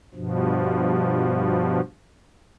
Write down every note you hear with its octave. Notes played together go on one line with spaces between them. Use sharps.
G2 B2 F3